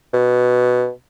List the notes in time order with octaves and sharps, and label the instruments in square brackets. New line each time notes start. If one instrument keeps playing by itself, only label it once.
[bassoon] B2